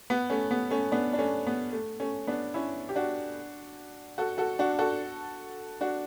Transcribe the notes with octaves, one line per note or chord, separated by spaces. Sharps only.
B3
A3 C#4
B3
A3 C#4
B3 D4
D4
A3 C#4
B3
A3
A3 C#4
B3 D4
C#4 E4
G4
D4 F#4
F#4 A4
F#4 A4
D4 F#4
F#4 A4
D4 F#4